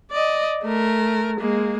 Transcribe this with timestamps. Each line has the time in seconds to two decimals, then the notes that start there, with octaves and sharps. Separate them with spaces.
0.11 D5 D#5
0.64 A3 A#4
1.40 G#3 A#3